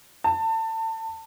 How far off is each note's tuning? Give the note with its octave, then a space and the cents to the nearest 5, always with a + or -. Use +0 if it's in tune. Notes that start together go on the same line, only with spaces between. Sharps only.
A5 +30